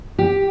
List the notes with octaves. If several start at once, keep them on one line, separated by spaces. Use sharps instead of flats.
G4